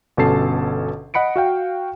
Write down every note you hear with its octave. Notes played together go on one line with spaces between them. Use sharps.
G1 B2 C#4 A4 A5 C7
D#5 F#5 B5 C#7 D7
F#4 F5 G5